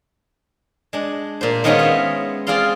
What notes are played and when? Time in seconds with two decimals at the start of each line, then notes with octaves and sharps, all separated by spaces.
0.93 G#3 D4
1.41 A#2 C5
1.64 D#3 G#3 B3 C#4 F4 G#4
1.79 C#5 E5
2.47 C4 F4 G#4 D5 F5 C6